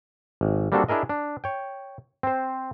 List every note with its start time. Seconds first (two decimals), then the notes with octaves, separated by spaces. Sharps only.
0.41 G#1
0.72 G3 A#3 C4 D4 F#4 A4
0.88 D4 E4 G#4 A#4 D#5
1.09 D4
1.44 C#5 G5
2.23 C4 C5